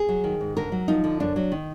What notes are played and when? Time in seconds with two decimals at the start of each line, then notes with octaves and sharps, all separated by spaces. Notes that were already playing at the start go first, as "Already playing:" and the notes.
Already playing: G#4
0.09 F#3
0.24 D#3
0.41 G#2
0.57 D3 A#4
0.72 F#3
0.88 F3 D#4
1.04 D3
1.20 F#2 D4
1.36 F#3
1.52 D#3